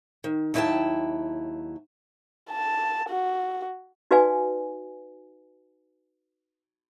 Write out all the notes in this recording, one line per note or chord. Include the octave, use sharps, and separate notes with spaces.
D#3
D#2 F#3 E4 E5 G5 A5
A5
F#4
D#4 F#4 B4 D5 F5 G#5